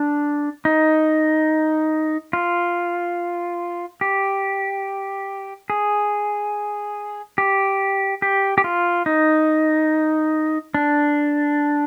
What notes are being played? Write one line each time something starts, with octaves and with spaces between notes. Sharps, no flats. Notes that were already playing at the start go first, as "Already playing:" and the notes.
Already playing: D4
D#4
F4
G4
G#4
G4
G4
G4
F4
D#4
D4